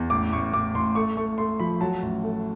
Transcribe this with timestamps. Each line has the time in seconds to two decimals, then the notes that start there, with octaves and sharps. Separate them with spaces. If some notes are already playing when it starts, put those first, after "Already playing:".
Already playing: E2
0.10 A1 D6
0.32 A1 C#6
0.53 A1 D6
0.74 A1 C6
0.95 A3 C#6
1.17 A3 C#6
1.38 A3 C6
1.59 F3 B5
1.80 F#3 A5
2.02 A1
2.23 A3